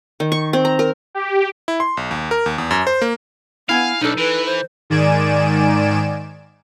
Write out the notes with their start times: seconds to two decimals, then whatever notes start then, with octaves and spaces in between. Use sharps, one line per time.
0.20 D#3
0.32 C#6
0.53 C4
0.65 A#5
0.79 A#4
1.15 G4
1.68 E4
1.80 C6
1.97 B1
2.11 D#2
2.31 A#4
2.46 D#2
2.58 E2
2.71 F#2
2.87 C5
3.02 A#3
3.69 B3 E4 F5 G#5
4.01 B1 D4 D#4 A4
4.18 E3 B4
4.46 C5
4.90 G#2 D#3 D5 G#5 D7 E7